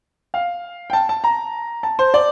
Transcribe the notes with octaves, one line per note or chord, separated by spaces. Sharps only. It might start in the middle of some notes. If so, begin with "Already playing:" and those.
F5
G5
A5
A5
A#5
A5
C5
D5